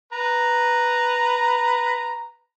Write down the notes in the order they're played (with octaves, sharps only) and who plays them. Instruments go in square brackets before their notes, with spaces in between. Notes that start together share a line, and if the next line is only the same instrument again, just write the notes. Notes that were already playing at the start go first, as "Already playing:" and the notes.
[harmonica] B4 A#5